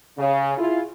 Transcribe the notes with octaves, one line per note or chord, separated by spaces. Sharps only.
C#3
E4 F4 G#4